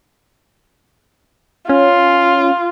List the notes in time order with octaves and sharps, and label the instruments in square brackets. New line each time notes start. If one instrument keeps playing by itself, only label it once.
[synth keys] C#4 [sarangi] F4